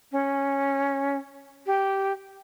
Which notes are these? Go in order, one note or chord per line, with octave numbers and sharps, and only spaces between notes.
C#4
G4